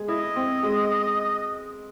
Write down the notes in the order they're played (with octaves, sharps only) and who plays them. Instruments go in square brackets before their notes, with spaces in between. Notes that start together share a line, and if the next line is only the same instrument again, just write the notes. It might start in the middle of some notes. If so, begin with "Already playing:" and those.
Already playing: [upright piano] G#3 G#4
[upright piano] E4 [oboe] D#5
[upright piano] C4
G#3